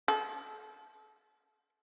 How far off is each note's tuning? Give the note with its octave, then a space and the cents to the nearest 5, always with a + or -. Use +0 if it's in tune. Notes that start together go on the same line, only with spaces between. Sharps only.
A4 -35